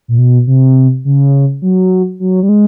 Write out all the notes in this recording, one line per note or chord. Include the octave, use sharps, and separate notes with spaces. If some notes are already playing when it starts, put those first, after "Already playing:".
A#2
B2
C3
C#3
F#3
F#3
G3
G#3